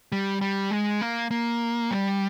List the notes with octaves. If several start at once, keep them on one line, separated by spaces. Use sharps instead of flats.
G3
G3
G#3
A#3
A#3
G3